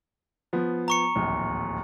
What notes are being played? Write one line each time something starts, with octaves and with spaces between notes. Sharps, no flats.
F3 B3
A#5 C#6 C#7
D1 A#1 D#2